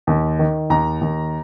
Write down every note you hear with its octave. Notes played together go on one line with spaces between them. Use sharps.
D#2
D#3
D#2 A#5
D#2